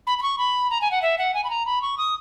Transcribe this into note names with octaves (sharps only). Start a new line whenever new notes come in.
B5
B5
C#6
B5
A#5
G#5
F#5
E5
F#5
G#5
B5
A#5
B5
C#6
D#6